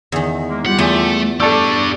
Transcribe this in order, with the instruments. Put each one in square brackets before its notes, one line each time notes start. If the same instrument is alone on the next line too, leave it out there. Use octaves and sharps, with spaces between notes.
[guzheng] E2 D#3
[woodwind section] G#3 A#3
[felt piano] G3 [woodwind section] F4 G4 [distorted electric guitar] F#5
[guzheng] E2 [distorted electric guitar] A3
[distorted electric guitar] D4 G4 [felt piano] A4 A5 E6 [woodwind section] D5 C#6